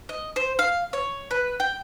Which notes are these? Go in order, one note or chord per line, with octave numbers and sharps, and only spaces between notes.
D#5
C5
F5
C#5
B4
G5